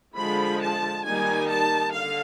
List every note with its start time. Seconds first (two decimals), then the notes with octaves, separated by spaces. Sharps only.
0.16 D3 F3 G#3 B5
0.60 A5
1.04 D#3 G3 A#3 D#4 G#5
1.49 A5
1.92 D3 F5